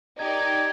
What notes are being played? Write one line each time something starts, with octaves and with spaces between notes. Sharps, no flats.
D#4 G4 A#4 D5 G#6
G#6